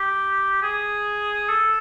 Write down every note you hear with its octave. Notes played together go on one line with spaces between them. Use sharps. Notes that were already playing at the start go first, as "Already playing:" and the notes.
Already playing: G4
G#4
A4